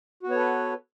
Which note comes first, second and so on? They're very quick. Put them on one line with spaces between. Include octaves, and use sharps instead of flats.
F#4 B3 C#5 A4 B4